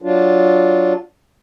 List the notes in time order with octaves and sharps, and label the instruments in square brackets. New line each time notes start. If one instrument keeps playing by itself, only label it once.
[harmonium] F#3 D4 F4